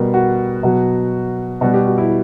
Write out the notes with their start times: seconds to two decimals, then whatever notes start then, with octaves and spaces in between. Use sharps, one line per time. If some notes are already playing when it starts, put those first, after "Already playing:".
Already playing: B2 G3 A#4
0.14 F#4
0.63 B2 F#3
1.61 B2 G3 F#4
1.74 G4
1.85 F#4
1.98 E4